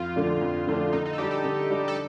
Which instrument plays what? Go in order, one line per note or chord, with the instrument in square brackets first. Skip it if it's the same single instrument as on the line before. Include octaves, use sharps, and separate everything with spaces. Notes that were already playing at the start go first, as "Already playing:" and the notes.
Already playing: [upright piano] F2 [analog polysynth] F4
[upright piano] D3 F3 A3 D4
F2
D3 F3 A3 D4
[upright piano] D3 [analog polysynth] D#4
[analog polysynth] D#4
A4
[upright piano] G3 D4 [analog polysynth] G4
[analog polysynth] A4
[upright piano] D3
G3 D4
[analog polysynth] A4